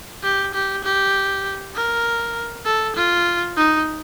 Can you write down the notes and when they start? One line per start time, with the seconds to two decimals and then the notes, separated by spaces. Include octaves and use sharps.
0.23 G4
0.54 G4
0.84 G4
1.75 A#4
2.66 A4
2.97 F4
3.57 D#4